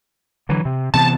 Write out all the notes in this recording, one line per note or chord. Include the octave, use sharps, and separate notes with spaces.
D3 E3 F#3
C3
C3 E3 B3 A5